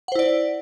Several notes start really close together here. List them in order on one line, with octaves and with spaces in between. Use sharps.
F#5 C5 E4 D5